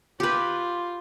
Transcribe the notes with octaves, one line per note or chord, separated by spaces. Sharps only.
F4 G4 B4